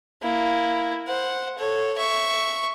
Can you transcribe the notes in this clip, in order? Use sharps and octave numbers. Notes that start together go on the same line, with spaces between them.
A#3 E4
C5 F#5
A4 C#5
E5 C#6